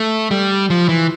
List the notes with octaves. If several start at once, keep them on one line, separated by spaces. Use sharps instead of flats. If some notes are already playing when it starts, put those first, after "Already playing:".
Already playing: A3
G3
F3
E3